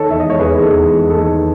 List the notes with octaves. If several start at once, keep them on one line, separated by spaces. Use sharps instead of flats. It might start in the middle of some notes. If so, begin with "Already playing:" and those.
Already playing: D#3 A4 C#5
E2 E5
G#3 D#5
C#5
E2 G#4 B4
D#3
A4
E2
G#3
E2
A4
D#3